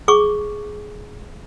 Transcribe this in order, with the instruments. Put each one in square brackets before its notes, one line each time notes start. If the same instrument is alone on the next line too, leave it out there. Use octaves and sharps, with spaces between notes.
[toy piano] G#4 C#6 D6